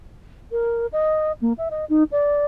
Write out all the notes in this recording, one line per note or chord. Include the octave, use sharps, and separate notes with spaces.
A#4
D#5
A#3
E5
D#5
D#4
D5